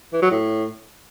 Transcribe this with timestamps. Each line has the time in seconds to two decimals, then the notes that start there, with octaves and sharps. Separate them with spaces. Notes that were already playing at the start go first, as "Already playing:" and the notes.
0.13 E3
0.22 F#3
0.31 A2